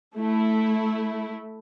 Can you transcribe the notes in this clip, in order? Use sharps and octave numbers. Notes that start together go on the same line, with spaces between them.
A3 E4